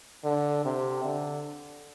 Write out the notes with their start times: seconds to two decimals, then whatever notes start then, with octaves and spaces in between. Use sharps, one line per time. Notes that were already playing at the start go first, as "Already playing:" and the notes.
0.24 D3
0.65 C3
1.04 D3